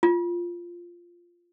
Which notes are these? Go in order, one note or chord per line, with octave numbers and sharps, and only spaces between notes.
F4